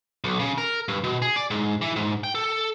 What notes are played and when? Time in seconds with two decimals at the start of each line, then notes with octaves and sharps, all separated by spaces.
0.24 B1
0.39 C#3
0.58 A#4
0.88 G2
1.04 B2
1.22 G#4
1.36 D5
1.51 G#2
1.81 E3
1.96 G#2
2.24 G5
2.35 A4